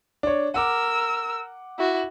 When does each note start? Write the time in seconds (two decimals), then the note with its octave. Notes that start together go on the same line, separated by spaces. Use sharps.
0.23 D4 C#5
0.54 A#4 F#5 D6 E6
1.78 E4 F#4